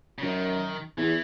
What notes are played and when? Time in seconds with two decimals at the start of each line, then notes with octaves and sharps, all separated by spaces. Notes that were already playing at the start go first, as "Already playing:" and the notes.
0.18 C#3
0.23 F#2 D#3
0.98 E2 E3